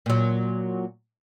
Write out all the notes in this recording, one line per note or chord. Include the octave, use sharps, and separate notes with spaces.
A#2 F#3